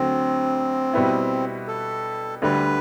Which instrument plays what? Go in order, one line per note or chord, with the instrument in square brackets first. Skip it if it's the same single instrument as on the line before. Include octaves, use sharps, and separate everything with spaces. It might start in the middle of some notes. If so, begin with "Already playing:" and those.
Already playing: [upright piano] D2 D3 F#3 A3 [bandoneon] C4
[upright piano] B2 G3 B3 E4
[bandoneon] A4
[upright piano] D2 D3 G3 [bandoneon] B4